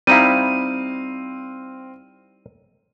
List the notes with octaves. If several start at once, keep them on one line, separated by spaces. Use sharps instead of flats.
G3 C4 D#4 E4 F5 D#7